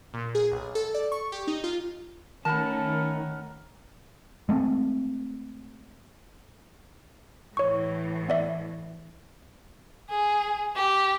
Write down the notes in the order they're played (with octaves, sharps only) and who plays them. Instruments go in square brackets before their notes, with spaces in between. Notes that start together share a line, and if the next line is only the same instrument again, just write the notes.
[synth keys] A#2
G#4
B1
A4
D5
C#6
G4
D#4
F4
[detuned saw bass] D#3 [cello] A3 C#4 [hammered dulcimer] A#4 F#5 B5 [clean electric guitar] A5
[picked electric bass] G#3 A3 C4
[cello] A2 E3 [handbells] C#5 C#6
[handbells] B3 D5 E5
[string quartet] G#4
G4